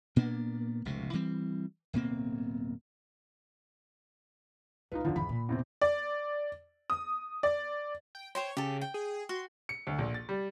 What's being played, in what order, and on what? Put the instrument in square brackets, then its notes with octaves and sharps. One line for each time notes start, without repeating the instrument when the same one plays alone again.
[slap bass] A#2 A#3 B3 D4
F1 C#2 B2
E3 G3 C4
D1 B2 A#3 C4
[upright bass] C#2 [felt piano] D#4 F4 B4
[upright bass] E2 D4 [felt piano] D3 D#3 F3
[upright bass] E2 G#2 [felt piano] B5
[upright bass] A#2
[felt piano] E2 C3 C4
[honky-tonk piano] D5
D#6
D5
[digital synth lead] G5
[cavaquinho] C5 G5 C6 [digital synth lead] C#5
[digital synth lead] C#3 [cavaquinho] G4 A4
[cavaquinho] G5
[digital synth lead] G#4
[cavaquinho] F#4 [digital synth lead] C6
[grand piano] C#7
D2
A#1
A6
G3